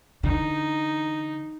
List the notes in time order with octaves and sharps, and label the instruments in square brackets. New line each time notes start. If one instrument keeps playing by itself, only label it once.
[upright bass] D3 E3 [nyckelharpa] D#4